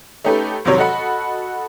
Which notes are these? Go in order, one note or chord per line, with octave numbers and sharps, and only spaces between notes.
A3 C#4 D#4 G4 A4 B4
F1 G#2 C3 D#3 F#3 C#5
F#4 A4 D#5 F#5 B5